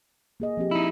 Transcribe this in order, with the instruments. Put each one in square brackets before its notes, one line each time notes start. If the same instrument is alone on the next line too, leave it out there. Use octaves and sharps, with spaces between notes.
[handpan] A#3 G#4 D#5
F3 C4 G4
[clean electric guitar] D#4 E4